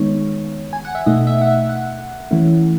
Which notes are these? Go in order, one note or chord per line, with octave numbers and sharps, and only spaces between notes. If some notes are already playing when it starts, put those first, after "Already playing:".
Already playing: D#3 G#3 B3 D#4 C#5
G#5
F#5
E5
B2 A3 D#4 D#5
E5
F#5
E5
F#5
E3 A3 C#4 E4